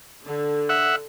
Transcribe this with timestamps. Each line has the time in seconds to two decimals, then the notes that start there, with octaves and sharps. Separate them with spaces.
0.25 D3
0.69 E5 F#5